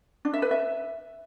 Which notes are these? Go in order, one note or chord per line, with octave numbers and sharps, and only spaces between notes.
D4
E5
B4
E5